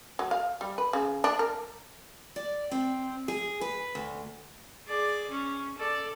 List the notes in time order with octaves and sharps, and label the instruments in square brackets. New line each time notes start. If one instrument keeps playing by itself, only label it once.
[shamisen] F#3
F5
G3
B4
C#3
D4
A#4
[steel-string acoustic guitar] D5
C4
G#4
B4
D2
[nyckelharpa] G#4 D5
C#4
A4 D5